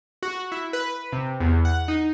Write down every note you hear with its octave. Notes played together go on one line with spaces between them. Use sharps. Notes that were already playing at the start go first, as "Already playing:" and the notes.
F#4
E4
B4
C3
E2
F#5
D#4